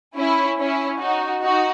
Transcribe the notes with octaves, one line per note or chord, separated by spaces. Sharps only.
C#4 E4
C#4 E4
D#4 F#4
D#4 F#4